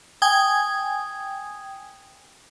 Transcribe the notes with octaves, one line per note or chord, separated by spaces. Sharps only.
G5 G#5 D#6 G#6